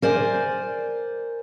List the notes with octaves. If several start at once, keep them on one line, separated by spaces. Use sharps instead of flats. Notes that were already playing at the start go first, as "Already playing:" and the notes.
A#4 C5 D5 G#5